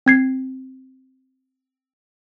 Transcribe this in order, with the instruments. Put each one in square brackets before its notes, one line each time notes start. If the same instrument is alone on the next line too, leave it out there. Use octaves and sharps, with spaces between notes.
[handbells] C4 G#6 C7